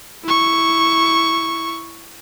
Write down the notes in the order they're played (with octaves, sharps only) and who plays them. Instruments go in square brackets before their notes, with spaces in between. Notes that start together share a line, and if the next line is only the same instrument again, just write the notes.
[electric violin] E4 C#6